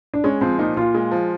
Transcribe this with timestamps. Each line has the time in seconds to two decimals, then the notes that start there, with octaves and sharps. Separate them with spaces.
0.14 D4
0.24 G#3 C#4
0.41 F3 C4
0.59 A#2 D#4
0.76 A#2 F4
0.95 G#3
1.11 F3